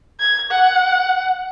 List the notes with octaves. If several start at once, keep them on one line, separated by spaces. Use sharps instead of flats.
G#6
F#5